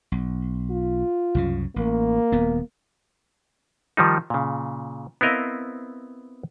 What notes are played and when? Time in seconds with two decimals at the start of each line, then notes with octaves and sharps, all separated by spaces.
0.12 B1
0.71 F4
1.35 C2 F#2 C#3
1.76 A1 A#3
2.32 D#1 B3
3.97 D#3 F3 G3 D#4
4.30 A#2 C#3
5.21 B3 C4 E4 A#4 D#5 F5